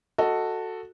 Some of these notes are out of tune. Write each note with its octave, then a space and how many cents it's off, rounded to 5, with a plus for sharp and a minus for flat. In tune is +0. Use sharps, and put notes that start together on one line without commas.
F#4 -5 A4 +10 D#5 +10